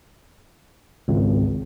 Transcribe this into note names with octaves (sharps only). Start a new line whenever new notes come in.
G#1 C#2